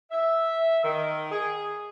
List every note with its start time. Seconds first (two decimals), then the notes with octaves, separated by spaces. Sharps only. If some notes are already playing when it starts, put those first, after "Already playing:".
0.11 E5
0.83 D#3
1.30 G#4